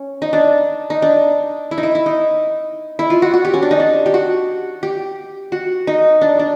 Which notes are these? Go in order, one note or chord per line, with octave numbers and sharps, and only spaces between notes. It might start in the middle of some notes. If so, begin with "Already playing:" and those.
Already playing: C#4
D#4
D4
D#4
D4
E4
D#4
E4
E4
D#4
E4
F4
F#4
F#4
G4
C#4
D4
D#4
D4
G4
F#4
G4
F#4
D#4
D4
D4